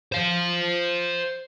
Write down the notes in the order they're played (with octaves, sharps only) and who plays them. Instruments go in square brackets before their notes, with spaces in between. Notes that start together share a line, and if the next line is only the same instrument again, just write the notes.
[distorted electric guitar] C5 F5